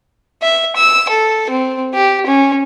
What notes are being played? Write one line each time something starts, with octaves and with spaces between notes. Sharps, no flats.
E5
E6
A4
C4
G4
C#4